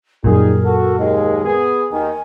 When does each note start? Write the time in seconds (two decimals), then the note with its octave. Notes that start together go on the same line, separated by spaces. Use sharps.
0.24 F#2 A#2 G3 D#4 G#4 A#4
0.64 F#4 A4
0.98 D#2 G#3
1.44 B3 G#4
1.92 D#2 D#3 G#5